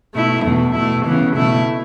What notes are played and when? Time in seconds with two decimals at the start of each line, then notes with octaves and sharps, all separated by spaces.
0.14 B2 A3 E4
0.44 E2 B2 A3
0.74 B2 A3 E4
1.04 C#3 E3 B3
1.33 B2 A3 E4